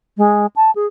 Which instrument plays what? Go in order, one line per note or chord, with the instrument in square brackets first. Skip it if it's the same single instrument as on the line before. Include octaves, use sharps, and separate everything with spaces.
[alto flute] G#3
A5
G#4